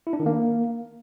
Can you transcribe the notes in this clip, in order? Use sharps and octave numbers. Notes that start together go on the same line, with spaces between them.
E4
D4
D#3
A#3